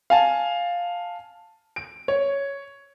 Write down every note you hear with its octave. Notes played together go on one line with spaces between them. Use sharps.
F5 G#5 A5
D7
C#5